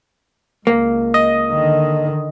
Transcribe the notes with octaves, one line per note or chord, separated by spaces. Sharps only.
C#2 A#3
D#5
D3 D#3